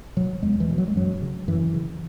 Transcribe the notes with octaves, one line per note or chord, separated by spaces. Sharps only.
B2 F#3
E2 G#3
E3
B2
F#3
G#3
F#2 F#3
C#3
F#2 E3
C#3